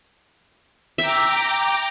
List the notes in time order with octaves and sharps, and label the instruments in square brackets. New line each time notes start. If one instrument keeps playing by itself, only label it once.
[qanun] E5 [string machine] G5 A#5 D6